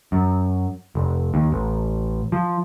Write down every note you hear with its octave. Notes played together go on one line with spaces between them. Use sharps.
F#2
F1
D#2
A1
F3